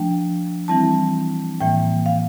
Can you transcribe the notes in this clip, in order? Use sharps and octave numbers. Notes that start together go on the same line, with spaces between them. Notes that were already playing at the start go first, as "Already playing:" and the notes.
Already playing: F3 A3 D4 G5
E3 G3 C4 E4 A5
A2 E3 A#3 G5
F5